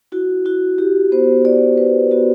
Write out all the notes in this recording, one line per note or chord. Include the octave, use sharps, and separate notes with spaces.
E4 F#4
E4 F#4
E4 G4
B3 C5
B3 D5
B3 B4
B3 F#4